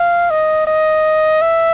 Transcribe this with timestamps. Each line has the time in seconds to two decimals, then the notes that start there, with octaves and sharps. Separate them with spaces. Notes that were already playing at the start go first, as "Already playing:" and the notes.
Already playing: F5
0.30 D#5
0.67 D#5
1.41 E5